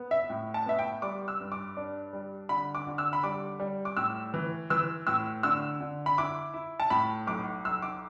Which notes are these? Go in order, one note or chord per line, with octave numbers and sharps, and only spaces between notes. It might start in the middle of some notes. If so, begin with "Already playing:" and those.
Already playing: B3
E5
A2
A5
B3 E5
G5
G3 D6
E6
G2
D6
D4
G3
D3 B5
D6
D3
E6
B5
G3 D6
G3
D6
A2 E6
E3
E3 E6
A2 E6
D3 E6
D3
B5
E4 D6
E4
A5
A2 B5
B1 D6
B1 E6
D6